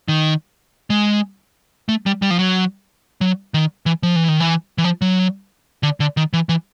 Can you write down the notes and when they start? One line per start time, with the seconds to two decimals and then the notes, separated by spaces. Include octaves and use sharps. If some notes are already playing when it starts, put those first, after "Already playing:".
0.08 D#3
0.90 G#3
1.89 A3
2.06 G3
2.22 G3
2.31 F3
2.39 F#3
3.21 F#3
3.54 D#3
3.86 E3
4.03 F3
4.16 E3
4.28 D#3
4.40 E3
4.78 E3
4.84 F3
5.01 F#3
5.83 D3
6.00 D3
6.17 D#3
6.33 E3
6.49 E3